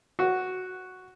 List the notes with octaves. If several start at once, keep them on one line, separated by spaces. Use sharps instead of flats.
F#4